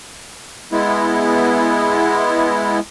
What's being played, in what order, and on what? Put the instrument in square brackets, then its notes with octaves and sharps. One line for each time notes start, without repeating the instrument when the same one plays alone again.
[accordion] G#3 B3 E4